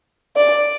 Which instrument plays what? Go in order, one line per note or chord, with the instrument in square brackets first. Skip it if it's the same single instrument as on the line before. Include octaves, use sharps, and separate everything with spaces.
[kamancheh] D5